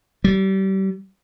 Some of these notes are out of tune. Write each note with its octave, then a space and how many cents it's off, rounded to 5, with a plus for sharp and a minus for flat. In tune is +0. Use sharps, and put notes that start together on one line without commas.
G3 -30